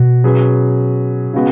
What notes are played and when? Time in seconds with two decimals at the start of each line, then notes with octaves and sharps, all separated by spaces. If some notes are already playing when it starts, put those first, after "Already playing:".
Already playing: B2 F#4
0.24 F#3 C#4 G#4 B4
1.34 C#3 G#3 B3 F#4